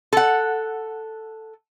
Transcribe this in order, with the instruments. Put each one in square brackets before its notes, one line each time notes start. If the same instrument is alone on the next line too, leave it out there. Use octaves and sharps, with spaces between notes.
[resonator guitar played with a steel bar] A4 F#5